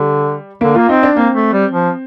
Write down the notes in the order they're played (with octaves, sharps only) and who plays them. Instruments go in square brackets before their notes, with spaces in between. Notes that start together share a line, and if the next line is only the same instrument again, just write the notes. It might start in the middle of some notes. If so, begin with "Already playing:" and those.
Already playing: [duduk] D3 [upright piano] G3
[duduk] D3 [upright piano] A#3
[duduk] A#3 [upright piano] F4
[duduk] C4 [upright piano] D#4
[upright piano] D4
[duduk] A#3 [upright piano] C4
[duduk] A3
G3
F3